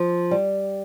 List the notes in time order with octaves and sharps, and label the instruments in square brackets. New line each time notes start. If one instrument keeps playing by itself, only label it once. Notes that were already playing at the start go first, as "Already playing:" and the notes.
Already playing: [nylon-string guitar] F3
G3